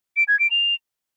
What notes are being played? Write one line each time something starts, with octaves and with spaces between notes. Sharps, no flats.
D7
G#6
D7
F7